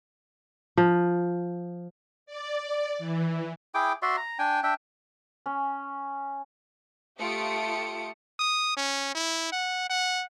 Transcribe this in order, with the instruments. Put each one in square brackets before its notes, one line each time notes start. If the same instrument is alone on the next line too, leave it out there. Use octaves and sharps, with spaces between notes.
[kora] F3
[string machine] D5
E3
[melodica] E4 G#4 G5 D6
F#4 D5 E5 C6
A#5
D4 G5 G#5
D4 E5 G5
[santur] C#4
[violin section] A3 F4 G4 D#6 C#7 D7
[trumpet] D#6
C#4
E4
F#5
F#5